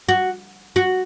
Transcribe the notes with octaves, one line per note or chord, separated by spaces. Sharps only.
F#4
F#4